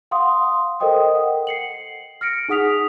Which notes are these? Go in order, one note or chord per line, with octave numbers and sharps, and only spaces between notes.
F5 F#5 C6 D#6
A4 A#4 C5 D#5 G5 D#6
F#5
C7 C#7 F#7
F6 A#6 C#7 D7
D#4 G#4 F#5 D#6 B6 F7